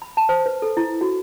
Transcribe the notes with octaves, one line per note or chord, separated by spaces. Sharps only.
B5
A5
C5
B4
A4
E4
F#4